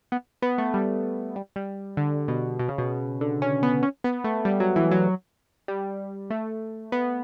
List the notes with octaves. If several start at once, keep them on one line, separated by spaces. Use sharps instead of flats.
B3
B3
A3
G3
G3
G3
D3
B2
B2
C#3
B2
D3
C#4
B3
C#4
B3
A3
G3
F#3
E3
F#3
G3
A3
B3